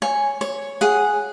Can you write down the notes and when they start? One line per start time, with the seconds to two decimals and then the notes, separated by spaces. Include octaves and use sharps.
0.02 C#5 G#5
0.41 C#5
0.81 G#4 F#5